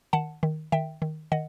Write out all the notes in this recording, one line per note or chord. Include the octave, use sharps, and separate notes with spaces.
D#3 F#5 A5
D#3
D#3 E5 G5
D#3
D#3 D#5 F#5